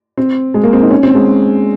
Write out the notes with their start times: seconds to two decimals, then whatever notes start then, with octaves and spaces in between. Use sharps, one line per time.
0.17 C4
0.54 G#3
0.63 A#3
0.73 C4
0.82 D#4
0.91 C#4
1.03 C4
1.15 G#3